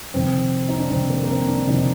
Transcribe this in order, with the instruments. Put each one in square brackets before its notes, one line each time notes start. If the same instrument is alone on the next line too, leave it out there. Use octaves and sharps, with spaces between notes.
[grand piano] F2 C3 D#3 C4
D#4
D4
F2 C3 D#3 C4
A#3
A#3
C4
D4
F2 C3 D#3 D#4